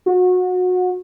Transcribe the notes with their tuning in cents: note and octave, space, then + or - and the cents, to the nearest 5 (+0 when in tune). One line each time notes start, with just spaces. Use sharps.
F#4 -25